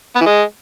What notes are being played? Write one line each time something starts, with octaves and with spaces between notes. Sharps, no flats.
B3
E3
G#3